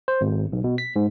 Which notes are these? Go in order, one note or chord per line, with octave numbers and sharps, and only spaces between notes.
C5
G#1
B1
B2
B6
G#2